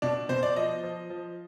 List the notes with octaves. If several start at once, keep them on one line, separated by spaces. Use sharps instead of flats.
B2 D4
B2 C5
D5
F3 D#5
F3
F3